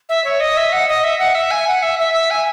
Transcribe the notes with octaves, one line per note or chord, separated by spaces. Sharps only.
E5
C#5
D#5
E5
F#5
D#5
E5
F#5
E5
G#5
F#5
E5
E5
E5
G#5